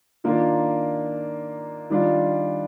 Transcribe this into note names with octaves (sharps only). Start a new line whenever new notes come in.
D#3 A#3 D4 F4
D#3 G3 D4 F4